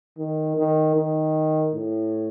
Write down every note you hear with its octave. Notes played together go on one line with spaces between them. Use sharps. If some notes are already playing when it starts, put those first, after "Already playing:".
D#3
D#3
D#3
A2